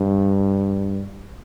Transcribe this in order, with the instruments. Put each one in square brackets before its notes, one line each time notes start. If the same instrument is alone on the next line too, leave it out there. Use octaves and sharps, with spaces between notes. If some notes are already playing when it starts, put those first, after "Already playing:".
Already playing: [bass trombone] G2